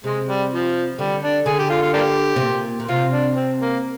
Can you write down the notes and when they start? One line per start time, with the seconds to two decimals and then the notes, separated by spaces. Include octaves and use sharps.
0.04 C3 G#3
0.27 G3
0.52 F3
0.99 D3 G3
1.23 D4
1.46 D3 G#4
1.59 G4
1.70 F4
1.82 F4
1.94 A#3 D4 G4
2.36 C3
2.41 A#2
2.80 A#2
2.89 C3 F4
3.12 D4
3.36 C4
3.61 A#3